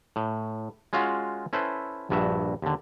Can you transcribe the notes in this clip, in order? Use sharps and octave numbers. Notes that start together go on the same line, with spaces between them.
A2
G#3 C#4 F4 F#4 F5 F#5
C#4 E4 A4 B4 C5
A#1 G2 F#4 E5
D#2 D3